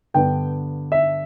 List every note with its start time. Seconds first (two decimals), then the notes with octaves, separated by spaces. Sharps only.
0.14 G2 D3 B3 D4 G5
0.92 E5